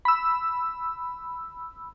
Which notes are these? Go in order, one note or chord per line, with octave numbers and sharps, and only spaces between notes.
B5 E6